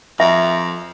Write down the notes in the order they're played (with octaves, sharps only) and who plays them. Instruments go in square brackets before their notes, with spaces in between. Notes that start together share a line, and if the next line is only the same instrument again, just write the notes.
[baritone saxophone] F2 [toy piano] E5